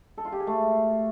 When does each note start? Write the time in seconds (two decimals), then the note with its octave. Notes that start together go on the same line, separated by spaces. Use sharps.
0.18 A4
0.25 F4
0.32 G4
0.40 G#4
0.47 A3